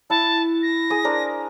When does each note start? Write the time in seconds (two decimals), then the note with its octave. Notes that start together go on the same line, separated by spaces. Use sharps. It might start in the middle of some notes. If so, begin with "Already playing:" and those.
0.10 E4 F#5 A5
0.63 A#6
0.90 G#4 D#6
1.04 D4 A#4 C5